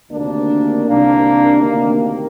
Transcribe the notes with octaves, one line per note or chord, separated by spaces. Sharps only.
D2 C3 D#3 A#3 D4
C2 C3 D#3 A#3 D4
D2 C3 D#3 A#3